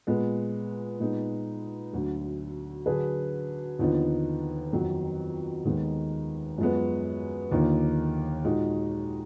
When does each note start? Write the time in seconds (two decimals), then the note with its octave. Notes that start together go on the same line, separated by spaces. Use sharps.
0.07 A#2 G#3 B3
1.00 A#2 G#3 B3 D#4
1.93 D2 D3 F#3
2.86 D3 F#3 D4 G#4 B4
3.79 D#2 D3 F3 B3 D#4
4.72 F2 D#3 F#3 B3
5.65 D#2 D#3 G#3 B3 D#4
6.58 F#2 F3 G#3 B3
7.51 D#2 D3 F3 A#3 D#4
8.44 A#2 G#3 D#4 F#4